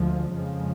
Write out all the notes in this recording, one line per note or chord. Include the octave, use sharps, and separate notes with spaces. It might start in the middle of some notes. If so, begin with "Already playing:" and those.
Already playing: D2 D3 F3 G#3
F2 C#3 F3 G#3